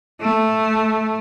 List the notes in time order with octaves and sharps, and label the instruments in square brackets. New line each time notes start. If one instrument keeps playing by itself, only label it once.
[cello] A3